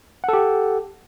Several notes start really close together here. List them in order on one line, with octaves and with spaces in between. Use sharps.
F#5 A4 G4